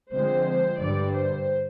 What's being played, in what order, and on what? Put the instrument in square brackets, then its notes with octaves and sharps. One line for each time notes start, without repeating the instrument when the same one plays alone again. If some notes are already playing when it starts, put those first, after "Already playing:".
[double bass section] D3 F3 G#3 C4 [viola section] C5
[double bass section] G2 D3 G3 [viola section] D5
[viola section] C5